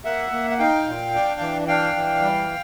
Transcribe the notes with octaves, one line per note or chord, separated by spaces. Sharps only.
A#3 E5 F#5
A#3
F#5
D#4 F5 G5
A#2
D4
E3
D4 F5 G5
E3
G3